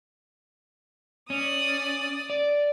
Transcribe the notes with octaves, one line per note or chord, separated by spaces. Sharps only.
C#4 D5 D#6
D5